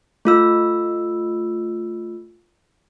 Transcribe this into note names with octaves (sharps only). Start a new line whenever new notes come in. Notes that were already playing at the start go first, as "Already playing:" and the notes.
A3 F4 E6